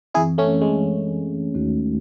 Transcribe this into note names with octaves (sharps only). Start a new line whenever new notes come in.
F#2 E3 C4 E4 G#4
A3 C#4
G#3
D#2 D#3 A3 D#4 F#4